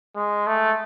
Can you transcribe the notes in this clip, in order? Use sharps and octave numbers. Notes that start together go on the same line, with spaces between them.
G#3
A3